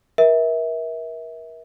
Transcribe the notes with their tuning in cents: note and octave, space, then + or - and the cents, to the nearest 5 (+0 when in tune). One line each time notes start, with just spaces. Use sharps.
A#4 +35 E5 -25